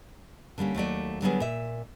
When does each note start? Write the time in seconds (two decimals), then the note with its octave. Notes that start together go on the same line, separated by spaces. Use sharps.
0.58 D3 G3 A#3 C#4
0.75 D#2 F#3 A3 D5
1.22 D3 F#3 G3 B3 F4 G#4
1.40 A#2 E5